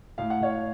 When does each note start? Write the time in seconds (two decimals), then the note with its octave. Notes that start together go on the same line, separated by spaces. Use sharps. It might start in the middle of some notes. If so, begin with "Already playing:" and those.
0.18 A2 F5
0.30 F#5
0.40 A2 C#5 F5